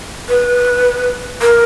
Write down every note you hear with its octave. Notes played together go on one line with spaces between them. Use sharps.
B4
A#4